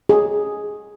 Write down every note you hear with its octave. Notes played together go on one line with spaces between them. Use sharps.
G#4